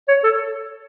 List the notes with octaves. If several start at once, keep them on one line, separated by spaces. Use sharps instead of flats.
C#5
A4